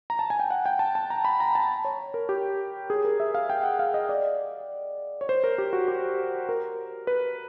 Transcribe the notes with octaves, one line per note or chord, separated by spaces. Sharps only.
A#5
A5
G#5
G5
F#5
G5
A5
A5
A#5
B5
A#5
A5
C#5
A#4
G4
G#4
A#4
E5
F5
G5
F#5
F5
D#5
D5
C#5
C5
A#4
G4
F#4
G4
A#4
B4